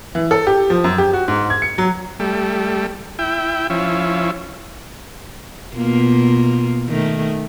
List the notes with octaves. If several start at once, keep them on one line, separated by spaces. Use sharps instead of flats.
E3
A4
G4
F3
F#2
G4
F#4
G#2
G#6
C#7
F#3
G3 A3
E4 G5
F3 C#4 E4
B2 A#3 F4
D#3 A3